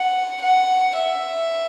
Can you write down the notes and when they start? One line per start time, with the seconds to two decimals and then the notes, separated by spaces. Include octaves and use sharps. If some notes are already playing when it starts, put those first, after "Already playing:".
Already playing: F#5
0.43 F#5
0.96 E5